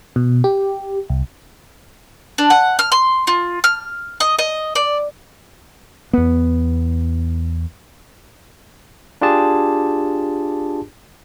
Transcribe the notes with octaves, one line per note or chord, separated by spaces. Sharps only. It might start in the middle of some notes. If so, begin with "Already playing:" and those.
B2
G4
C2
D4
F#5
F6
C6
F4
F6
D#5
D#5
D5
E2 B3
D4 F4 G4 G#4 A5